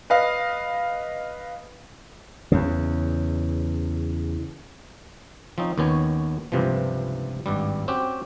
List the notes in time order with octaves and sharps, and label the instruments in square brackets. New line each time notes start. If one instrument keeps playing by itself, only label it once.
[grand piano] B4 D#5 F5
[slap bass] E2 C#3
[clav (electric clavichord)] F3 C4 C#4 D#4
D#2 D#3 B3 C#4 C#5
C#2 G2 C3 E3 F3
G#1 G2 G3
C4 C#4 F#4 G4